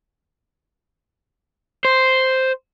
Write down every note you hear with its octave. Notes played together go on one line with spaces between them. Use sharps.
C5